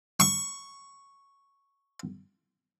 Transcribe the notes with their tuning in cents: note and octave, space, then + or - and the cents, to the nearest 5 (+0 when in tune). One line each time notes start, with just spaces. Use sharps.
C#6 +0